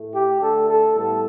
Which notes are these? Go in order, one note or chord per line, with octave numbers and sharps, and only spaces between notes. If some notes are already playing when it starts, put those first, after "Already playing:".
Already playing: A2 A3
G4
D3 A3 A4
A4
A2 G3 B3 A4